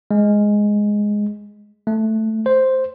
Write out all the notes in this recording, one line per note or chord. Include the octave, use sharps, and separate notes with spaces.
G#3
A3
C5